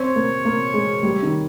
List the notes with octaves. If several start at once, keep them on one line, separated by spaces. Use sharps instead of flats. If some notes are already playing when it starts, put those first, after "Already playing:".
Already playing: C4 C#5
A#3
A#3
G#3
G3
D#3